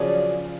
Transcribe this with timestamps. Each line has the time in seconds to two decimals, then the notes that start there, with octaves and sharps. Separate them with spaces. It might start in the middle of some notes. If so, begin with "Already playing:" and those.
Already playing: C#3 F3 F#3 C#4 G#4 D5